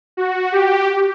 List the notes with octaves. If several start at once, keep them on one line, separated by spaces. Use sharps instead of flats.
F#4
G4